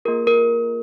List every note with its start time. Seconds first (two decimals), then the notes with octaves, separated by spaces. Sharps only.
0.05 A#3 F4 G#4 A#4
0.27 A#4